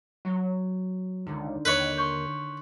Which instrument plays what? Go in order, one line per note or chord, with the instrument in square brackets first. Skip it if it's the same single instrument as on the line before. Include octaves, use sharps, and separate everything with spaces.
[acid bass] F#3
[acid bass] C#2 [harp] D3 D#3
[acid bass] D#2 [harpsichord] B4 C#5
[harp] C6 C#6 G6